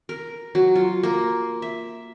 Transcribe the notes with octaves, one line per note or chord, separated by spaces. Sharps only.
A#4
F#3
F4
A#3
E5